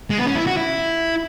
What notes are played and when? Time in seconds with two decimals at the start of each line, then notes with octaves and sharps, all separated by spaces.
0.10 G#3
0.18 B3
0.27 C#4
0.35 E4
0.47 F#4
0.57 E4